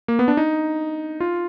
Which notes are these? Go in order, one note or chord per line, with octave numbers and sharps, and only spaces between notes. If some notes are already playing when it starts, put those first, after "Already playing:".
A#3
B3
D4
D#4
F4